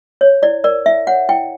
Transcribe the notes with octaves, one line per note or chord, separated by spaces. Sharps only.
C#5
E4 D5
A#4 D5
E4 E5
C#5 F#5
E4 G5